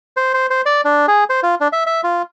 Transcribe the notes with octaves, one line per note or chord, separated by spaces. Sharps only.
C5
C5
C5
D5
D4
G#4
C5
F4
D4
E5
E5
F4